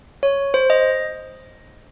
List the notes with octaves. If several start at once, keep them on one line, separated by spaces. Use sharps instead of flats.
C#5
C5
D#5